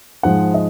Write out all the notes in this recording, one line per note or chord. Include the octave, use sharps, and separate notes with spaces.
G#2 F3 G#3 F#5
D#5